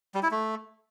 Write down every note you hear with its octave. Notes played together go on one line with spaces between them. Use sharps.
G3
E4
A3